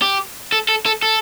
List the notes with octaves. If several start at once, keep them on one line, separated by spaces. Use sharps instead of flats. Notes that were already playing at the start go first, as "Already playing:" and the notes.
G4
A4
A4
A4
A4